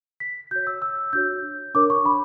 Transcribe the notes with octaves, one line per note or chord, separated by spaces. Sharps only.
B6
F#4 C#5 G6
E6
E6
D4 F#4 C#5 G6
D4 A#4 C#5 D6
C#6
B5